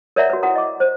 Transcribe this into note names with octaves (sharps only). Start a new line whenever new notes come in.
A#4 C#5 D5 E5 F#5 A#5
F#4 B4
E4 F#4 B4 F#5 A#5 D#6
D#5 D6
C5